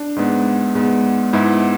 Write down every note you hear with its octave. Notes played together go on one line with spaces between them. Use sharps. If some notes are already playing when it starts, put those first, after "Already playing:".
Already playing: D4
G#2 G#3 B3
G#2 G#3 B3
G#2 G#3 B3 E4